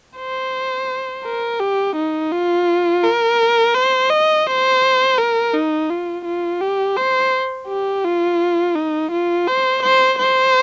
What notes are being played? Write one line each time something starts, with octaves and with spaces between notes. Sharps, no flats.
C5
A#4
G4
D#4
F4
A#4
C5
D#5
C5
A#4
D#4
F4
F4
G4
C5
G4
F4
D#4
F4
C5
C5
C5